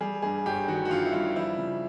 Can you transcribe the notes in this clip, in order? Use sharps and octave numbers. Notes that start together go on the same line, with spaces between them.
G3 G#4
G2 G#4
G1 G4
D#3 F#4
F#4
G2 F4
E4
G3 F4
F3 E4
C#3